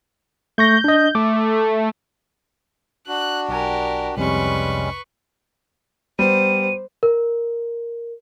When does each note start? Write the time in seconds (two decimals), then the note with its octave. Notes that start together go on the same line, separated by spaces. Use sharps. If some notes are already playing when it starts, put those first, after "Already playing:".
0.58 A3 C#6 G6 A#6
0.84 D4 D#5
1.15 A3 D6
3.08 D4 F#4 F#6
3.49 B1 G4 A#4 D5 G#5
4.17 C2 F2 C3 G3 G#3 C#4 B4 C#6
6.19 G3 B3 C5 D#7
7.03 A#4